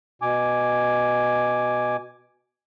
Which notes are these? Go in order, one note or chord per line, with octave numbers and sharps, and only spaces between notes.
B2 G#5 D6